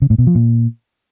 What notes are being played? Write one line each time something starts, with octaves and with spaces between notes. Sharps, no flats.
C#3
A2
B2
F3
A#2